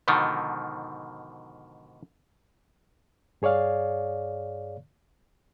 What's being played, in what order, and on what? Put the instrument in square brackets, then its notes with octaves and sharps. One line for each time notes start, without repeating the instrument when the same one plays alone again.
[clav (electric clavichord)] G#2 B2 D3 D#3 F3
[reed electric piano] G2 G#4 C#5 D5 F5